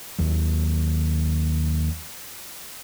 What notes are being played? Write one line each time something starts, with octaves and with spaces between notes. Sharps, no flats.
D#2 F#3